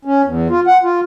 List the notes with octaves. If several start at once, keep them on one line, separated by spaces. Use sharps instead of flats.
C#4
E2
F4
F#5
F4